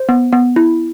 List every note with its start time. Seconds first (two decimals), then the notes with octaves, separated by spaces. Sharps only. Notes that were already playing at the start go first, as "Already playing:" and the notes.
Already playing: C5
0.09 B3
0.33 B3
0.56 E4